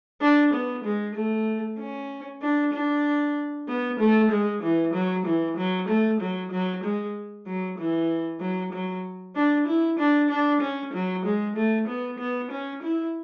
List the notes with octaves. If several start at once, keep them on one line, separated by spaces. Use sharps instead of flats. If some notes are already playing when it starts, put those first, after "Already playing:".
D4
B3
G#3
A3
C#4
D4
D4
B3
A3
G#3
E3
F#3
E3
F#3
A3
F#3
F#3
G#3
F#3
E3
F#3
F#3
D4
E4
D4
D4
C#4
F#3
G#3
A3
B3
B3
C#4
E4